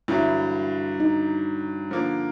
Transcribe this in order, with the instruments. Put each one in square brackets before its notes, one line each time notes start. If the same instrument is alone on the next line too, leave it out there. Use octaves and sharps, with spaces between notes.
[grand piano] G2 D3 F#3 [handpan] E4
[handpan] D#4
[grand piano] D3 F3 A#3